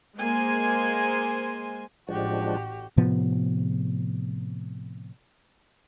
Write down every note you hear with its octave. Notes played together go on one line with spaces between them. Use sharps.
G#3 A#3 C5 G#5
A1 F3 G#3 D4 F#4 G4
A2 C3 F3 B3